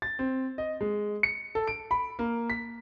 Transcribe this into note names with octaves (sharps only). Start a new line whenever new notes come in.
A6
C4
D#5
G#3
C#7
A4
D7
B5
A#3
B6